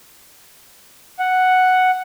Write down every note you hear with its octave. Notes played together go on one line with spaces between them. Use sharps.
F#5